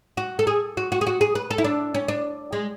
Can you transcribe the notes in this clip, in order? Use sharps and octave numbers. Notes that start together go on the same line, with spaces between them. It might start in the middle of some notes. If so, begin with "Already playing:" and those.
F#4
A4
G#4
F#4
F#4
G#4
F#4
G#4
B4
A4
E4
D4
C#4
D4
G#3